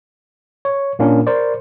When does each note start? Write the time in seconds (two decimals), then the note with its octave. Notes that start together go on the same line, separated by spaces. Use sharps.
0.65 C#5
0.99 A#2 A#3 C#4 D4 F4 A#4
1.27 A#4 C5 D5